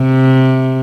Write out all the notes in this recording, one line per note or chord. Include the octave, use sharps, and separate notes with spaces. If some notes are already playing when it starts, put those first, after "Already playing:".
Already playing: C3